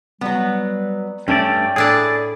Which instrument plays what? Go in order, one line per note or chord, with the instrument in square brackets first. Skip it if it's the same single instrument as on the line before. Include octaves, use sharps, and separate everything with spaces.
[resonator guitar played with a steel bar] F#3 B3 [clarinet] G3
[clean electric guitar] G2 A3 D5 [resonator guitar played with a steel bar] C#4 [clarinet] G5
[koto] A2 D4 E4 [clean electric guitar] G#4 D5